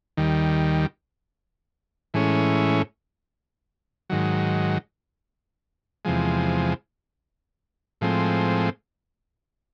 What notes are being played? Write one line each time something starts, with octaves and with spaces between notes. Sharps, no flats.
D#2 D#3 G3
A2 E3 G#3 C#4
G#2 D#3 F#3
E2 C3 F3 G#3
A2 F3 G#3 C4